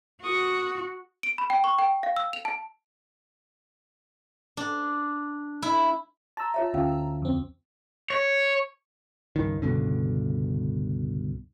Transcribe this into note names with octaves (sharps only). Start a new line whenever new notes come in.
F#4 C#6 D#6
D7
B5
G5
C#6
G5
F5
E6
F7
A5
D4
E4
A5 A#5 C6 E6
F4 C#5 E5
D2 C#4 F4 F5
F2 C4
C#5
C#2 G2 D#3
C#2 G2 B2 D3